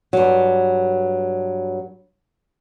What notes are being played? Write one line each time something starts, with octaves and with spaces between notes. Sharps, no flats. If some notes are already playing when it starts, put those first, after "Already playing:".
G2 F#3